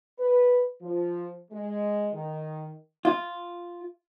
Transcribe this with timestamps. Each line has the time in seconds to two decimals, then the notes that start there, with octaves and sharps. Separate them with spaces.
0.18 B4
0.82 F3
1.51 G#3
2.13 D#3
3.05 F4